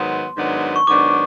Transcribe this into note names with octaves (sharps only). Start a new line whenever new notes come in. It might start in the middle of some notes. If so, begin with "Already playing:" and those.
Already playing: G#2 D#3 F#3 B3 C6
G#2 D#3 F#3 B3 D4
C#6
G#2 D#3 F#3 B3 D4 D6